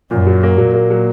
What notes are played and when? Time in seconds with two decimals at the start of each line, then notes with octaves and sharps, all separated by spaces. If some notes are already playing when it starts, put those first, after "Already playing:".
0.11 F#2 A#2
0.27 F#3
0.43 A#3
0.58 A#2 F#3
0.74 A#3
0.90 F#3